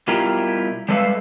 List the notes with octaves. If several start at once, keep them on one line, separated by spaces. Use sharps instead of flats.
B2 G3 E4 F4 G4 A#4
G3 G#3 A4 B4 E5 F5